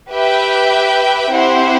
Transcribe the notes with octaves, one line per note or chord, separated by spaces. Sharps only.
G4 B4 E5 G5
C4 E4 G4 C5 F#5